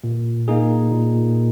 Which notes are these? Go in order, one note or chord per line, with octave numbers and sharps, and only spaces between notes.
A#2
A#3 D#4 G#4
A#2